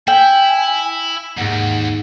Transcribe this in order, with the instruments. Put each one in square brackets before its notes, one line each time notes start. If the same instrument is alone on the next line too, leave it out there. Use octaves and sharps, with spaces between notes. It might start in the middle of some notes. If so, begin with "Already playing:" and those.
[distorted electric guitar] E4 [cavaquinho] G5 [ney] G#5
[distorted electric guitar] D#2 [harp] G#2 A#3 [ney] F#5